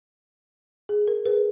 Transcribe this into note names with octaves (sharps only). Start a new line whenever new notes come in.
G#4
A#4
G#4 B4